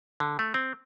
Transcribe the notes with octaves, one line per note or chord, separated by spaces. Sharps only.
D3
A3
C4